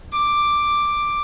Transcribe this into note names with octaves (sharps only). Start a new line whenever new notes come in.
D6